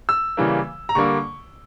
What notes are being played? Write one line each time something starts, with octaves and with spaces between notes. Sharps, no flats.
E6
C#3 E3 G3 A#3
A#5
D3 G3 A#3 C#6